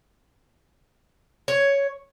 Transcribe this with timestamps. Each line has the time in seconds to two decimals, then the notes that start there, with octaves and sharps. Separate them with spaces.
1.48 C#5